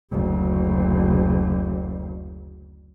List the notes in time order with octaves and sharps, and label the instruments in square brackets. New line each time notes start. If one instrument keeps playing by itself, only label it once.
[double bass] F#1 D2